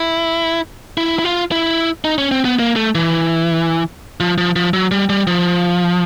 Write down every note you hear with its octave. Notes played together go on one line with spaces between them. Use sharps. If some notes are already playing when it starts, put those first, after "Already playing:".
Already playing: E4
E4
E4
F4
E4
D#4
C#4
C4
B3
A#3
A3
E3
F3
F3
F3
F#3
G3
G3
F3